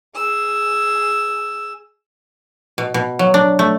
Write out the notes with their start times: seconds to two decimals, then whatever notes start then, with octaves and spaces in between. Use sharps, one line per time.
0.15 G#4 E6
2.78 B2
2.94 B2
3.19 F#3
3.34 D4
3.59 A3